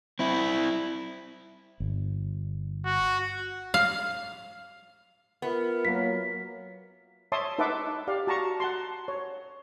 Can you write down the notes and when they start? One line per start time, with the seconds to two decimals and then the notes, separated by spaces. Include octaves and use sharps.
0.19 C4 E4
1.80 G1
2.86 F#4
3.74 F5
5.42 B3 F4 A#4 E5
5.85 F#3 A#3 B6
7.32 C#5 E5 A5 C6 D#6
7.58 D#4 B4 E5 F#5 A5 D6
8.07 G4 D5 F5
8.27 F#4 A5 A#5 C#6
8.60 F#5 A5 C6
9.08 C#5